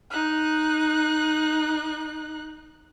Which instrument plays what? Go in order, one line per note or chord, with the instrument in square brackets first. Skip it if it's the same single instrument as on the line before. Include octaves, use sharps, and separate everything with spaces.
[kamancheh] D#4 F#6